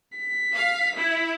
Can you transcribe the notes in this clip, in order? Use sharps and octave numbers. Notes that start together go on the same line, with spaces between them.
B6
F5
E4